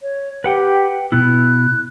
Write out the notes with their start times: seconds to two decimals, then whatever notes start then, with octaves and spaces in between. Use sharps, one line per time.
0.01 C#5
0.44 G4 B4 F#5 G5
1.12 B2 B3 E4 F#6